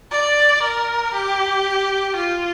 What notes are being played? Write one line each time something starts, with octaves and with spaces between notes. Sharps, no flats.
D5
A#4
G4
F4